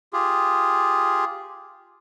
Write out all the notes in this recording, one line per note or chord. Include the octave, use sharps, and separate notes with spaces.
F4 G4 G#4